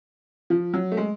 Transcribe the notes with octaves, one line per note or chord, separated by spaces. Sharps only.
F3
F#3
A3
G#3